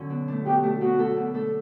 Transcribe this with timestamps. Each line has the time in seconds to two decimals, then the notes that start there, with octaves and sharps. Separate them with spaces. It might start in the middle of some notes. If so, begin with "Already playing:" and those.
Already playing: D3 F#3 B3 C#4
0.10 B2
0.28 A3 D4
0.46 B2 G4
0.63 A3 D4
0.80 B2 F#4
0.98 A3 D4 A4
1.16 B2
1.34 A3 D4 A4